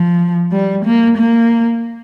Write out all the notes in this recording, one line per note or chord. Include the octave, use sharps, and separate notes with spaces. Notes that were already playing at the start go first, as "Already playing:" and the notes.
Already playing: F3
G3
A#3
A#3